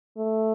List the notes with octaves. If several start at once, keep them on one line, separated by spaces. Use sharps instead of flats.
A3